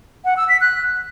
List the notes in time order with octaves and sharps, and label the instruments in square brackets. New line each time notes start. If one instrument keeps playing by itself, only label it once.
[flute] F#5
E6
B6
F#6